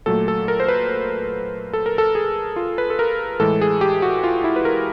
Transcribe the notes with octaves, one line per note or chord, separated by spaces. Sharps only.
A#2 F#3 A3 A4
A4
A#4
C5
B4
A4
A#4
A4
G#4
F4
B4
A4
A#4
A2 E3 G#3 A4
G#4
G4
F#4
F4
E4
B4
A#4